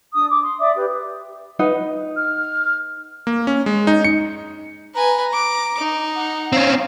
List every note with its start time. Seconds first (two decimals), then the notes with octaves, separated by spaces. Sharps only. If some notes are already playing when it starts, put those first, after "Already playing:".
0.14 D4 D#6
0.29 D6
0.41 C6
0.59 D5 E5 D6 D#6
0.75 G4 B4
1.59 D#4 B4 F#5
2.16 F6
3.27 A#3
3.47 C#4
3.66 G#3
3.87 D#4
4.04 C#7
4.95 B4 G#5 A#5
5.33 D6
5.79 D#4
6.15 F#5
6.52 C4 C#4 F5